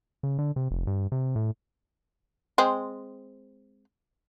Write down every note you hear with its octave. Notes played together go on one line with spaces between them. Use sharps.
C#3
D3
C3
F1
G2
C3
A2
G#3 C4